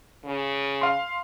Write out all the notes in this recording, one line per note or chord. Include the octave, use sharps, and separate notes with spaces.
C#3
F5 C6